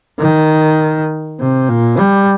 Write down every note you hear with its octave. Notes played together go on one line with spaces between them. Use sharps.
D#3
C3
A#2
G3